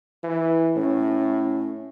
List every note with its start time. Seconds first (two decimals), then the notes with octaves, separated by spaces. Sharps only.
0.24 E3
0.76 A2 C#4